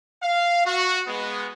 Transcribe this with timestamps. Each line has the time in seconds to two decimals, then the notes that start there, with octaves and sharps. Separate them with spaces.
0.23 F5
0.66 F#4
1.07 G#3 B3